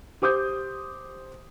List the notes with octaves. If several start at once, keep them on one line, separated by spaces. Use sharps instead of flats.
G4 C5 D6 D#6 G6